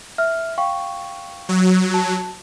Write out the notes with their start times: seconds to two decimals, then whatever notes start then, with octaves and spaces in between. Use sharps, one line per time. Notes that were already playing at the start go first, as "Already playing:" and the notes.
0.18 E5 F6
0.58 F5 G5 C#6
1.49 F#3
1.94 A5